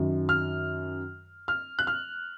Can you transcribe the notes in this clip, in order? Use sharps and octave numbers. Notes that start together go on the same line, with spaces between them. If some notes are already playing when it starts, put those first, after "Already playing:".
Already playing: F#2 D#3 F#3
F6
F6
F#6
F6